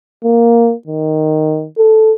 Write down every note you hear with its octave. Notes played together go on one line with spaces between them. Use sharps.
A#3
D#3
A4